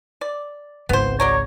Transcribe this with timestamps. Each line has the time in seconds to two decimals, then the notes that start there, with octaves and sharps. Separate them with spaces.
0.21 D5
0.89 G#1 C#2 B3 C5
1.20 F#3 C#5 D5 A#5